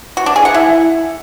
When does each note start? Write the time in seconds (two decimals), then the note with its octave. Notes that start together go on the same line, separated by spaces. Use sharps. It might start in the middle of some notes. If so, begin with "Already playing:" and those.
0.17 F#4
0.26 D4
0.36 G#4
0.45 F#5
0.54 E4